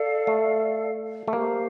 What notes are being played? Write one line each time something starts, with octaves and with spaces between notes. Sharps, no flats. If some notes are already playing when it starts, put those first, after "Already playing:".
Already playing: A4 D5 F5
A3
A3
A#3 G4 C5 F5